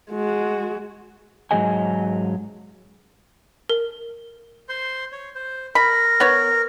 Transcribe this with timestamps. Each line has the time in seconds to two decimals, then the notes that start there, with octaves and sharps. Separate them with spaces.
0.11 G#3 F#4
1.51 G#2 F#3 B3 G#4 D#5 G#5
3.69 A#4
4.69 C5 C6
5.12 C#5
5.35 C5
5.75 A#4 B5
6.20 B3 C#5